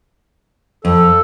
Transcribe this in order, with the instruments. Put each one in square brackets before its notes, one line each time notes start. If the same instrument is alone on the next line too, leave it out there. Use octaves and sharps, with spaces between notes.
[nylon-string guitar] F2 [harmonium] A4